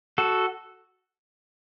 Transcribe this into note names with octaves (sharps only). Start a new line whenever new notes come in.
F#4 A4